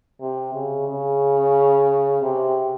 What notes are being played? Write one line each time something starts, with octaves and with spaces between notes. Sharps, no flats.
C3
C#3
C#3
C3